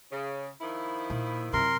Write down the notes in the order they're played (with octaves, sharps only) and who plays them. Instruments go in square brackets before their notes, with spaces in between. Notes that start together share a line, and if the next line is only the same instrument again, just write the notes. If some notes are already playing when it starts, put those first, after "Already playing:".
[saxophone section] C#3
D#3 F3 E4
[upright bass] A#2
[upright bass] F#2 C3 [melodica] A#4 C6